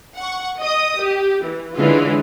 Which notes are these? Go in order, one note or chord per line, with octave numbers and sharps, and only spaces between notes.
F#5 C#6
D#5 D#6
G4
E3
D3 E3 G#3 C#4 F4